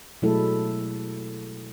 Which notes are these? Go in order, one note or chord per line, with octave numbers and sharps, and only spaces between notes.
B2 F#3 G#3 A3 E4 A4